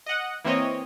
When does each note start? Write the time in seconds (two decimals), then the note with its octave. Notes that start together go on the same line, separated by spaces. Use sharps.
0.06 D#5 F#5
0.45 E3 A#3 C4 C#5 D#5